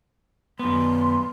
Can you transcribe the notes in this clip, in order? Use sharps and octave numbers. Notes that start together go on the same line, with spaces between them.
F#2 B3 C6